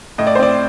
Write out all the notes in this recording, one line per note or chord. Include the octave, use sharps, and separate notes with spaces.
A2 D#5
D5
C5
C4 D5